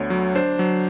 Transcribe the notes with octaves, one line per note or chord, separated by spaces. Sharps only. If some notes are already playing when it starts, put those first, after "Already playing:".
Already playing: D2 D3 B3 C#5
F#3
D4 C5
F#3